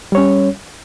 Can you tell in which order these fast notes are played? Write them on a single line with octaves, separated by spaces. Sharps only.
G3 C#5 C#4